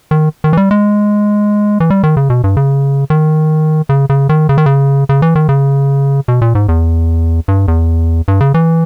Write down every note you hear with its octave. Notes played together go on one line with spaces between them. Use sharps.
D#3
D#3
E3
G3
G#3
E3
G3
D#3
C#3
B2
G2
C#3
D#3
C#3
C#3
D#3
C#3
D#3
C#3
C#3
E3
D#3
C#3
B2
A#2
G#2
E2
G2
E2
G2
C#3
E3